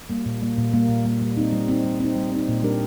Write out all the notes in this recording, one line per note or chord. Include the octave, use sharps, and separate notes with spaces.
G3 A#3
A#2
G3 A#3
A#2
G3 A#3
A#2
G3 A#3
G3
C4 D#4
G3
C4 D#4
G3
C4 D#4
G3
C4 D#4
A#2
G3 D4 G4 A#4